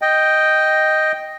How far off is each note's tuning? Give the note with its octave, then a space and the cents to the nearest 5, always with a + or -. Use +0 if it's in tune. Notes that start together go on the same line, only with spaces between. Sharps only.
D#5 +0 G5 +0